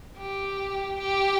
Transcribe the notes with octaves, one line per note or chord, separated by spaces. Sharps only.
G4
G4